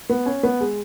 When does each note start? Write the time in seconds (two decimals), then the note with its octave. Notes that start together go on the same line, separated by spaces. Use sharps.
0.09 B3
0.26 C#4
0.43 B3
0.61 G#3